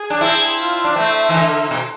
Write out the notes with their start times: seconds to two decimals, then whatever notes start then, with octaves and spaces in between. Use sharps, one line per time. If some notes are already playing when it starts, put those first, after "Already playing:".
Already playing: G#4
0.10 D4
0.21 C4 E4
0.59 F4
0.84 D4
0.96 A3 C4 E5
1.29 E3
1.34 D3
1.71 B2